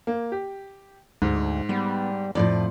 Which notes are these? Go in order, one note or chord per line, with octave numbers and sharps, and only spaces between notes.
A#3
G4
D2 G#2
G3 B3
F2 A2 F3 D5